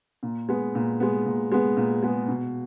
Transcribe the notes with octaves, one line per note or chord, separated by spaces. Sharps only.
A#2
G#3 B3
A#2
G#3 B3
A#2
G#3 B3
A#2
G#3 B3
B2